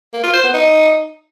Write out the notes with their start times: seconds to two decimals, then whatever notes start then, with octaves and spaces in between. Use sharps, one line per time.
0.13 A#3
0.23 F4
0.33 C5
0.43 B3
0.54 D#4